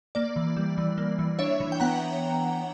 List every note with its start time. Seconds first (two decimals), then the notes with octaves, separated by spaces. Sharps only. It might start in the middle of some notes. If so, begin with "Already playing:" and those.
0.15 A#3 D5
0.36 E3
0.57 G3
0.78 E3
0.98 A#3
1.19 E3
1.39 D4 C#5 E5
1.60 E3
1.72 G5
1.80 B3 F#5 A#5